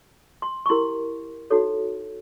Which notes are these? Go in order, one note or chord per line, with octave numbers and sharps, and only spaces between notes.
C6
C#6
E4 G4 A#4 C6
D#4 F#4 A4 C#5